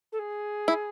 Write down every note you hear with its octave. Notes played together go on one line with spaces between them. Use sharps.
A4
G#4
E4